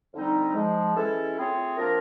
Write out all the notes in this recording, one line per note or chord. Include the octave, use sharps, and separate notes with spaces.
F2 D3 G3 C4 D#4
G#2 F3 G#3
E3 G#3 C#4 E4 A4
A3 C4 F4 G#4 C#5
F3 A#3 D4 F4 A#4